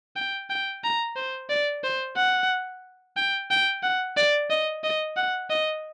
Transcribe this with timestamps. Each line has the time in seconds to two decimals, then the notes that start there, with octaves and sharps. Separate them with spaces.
0.16 G5
0.50 G5
0.84 A#5
1.16 C5
1.50 D5
1.84 C5
2.16 F#5
3.17 G5
3.51 G5
3.83 F#5
4.17 D5
4.50 D#5
4.84 D#5
5.17 F#5
5.50 D#5